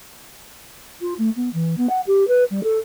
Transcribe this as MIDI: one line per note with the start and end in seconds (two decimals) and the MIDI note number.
1.01 1.14 65
1.18 1.30 57
1.36 1.49 59
1.53 1.77 52
1.77 1.87 59
1.89 2.01 78
2.07 2.27 67
2.28 2.44 71
2.51 2.63 55
2.64 2.79 69